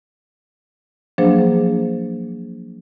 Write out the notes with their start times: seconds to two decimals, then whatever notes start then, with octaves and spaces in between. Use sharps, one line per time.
1.18 F3 F#3 A#3 D4 G#4 C5